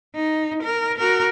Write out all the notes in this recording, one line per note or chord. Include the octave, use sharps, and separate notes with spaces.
D#4
A#4
F#4 A#4